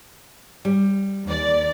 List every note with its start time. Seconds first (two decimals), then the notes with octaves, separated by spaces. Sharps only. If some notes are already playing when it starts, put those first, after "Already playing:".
0.65 G3
1.25 D#2 D5